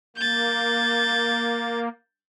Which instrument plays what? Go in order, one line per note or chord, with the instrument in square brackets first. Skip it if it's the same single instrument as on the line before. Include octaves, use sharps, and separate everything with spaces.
[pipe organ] A#3 [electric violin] G6 A6